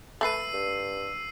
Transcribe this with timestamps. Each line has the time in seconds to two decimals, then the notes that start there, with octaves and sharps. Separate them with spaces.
0.21 A3 A4 B4 E6 C7 D#7
0.53 G2